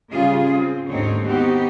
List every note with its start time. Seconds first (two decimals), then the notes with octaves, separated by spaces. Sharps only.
0.12 C#3 G3 F4 G#4
0.57 C4
0.89 D#2 G#2 D3 C4 D#4 C#5
1.26 B3 C4 D#4 F#4 G4